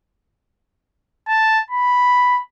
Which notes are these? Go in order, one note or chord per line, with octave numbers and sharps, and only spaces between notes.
A5
B5